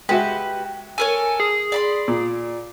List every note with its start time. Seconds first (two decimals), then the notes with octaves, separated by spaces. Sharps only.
0.09 G#3 F#4 G4 B4 E5
0.98 A4 A#4 C#5 G#5
1.40 G#4
1.72 D5 B5 C6
2.08 A#2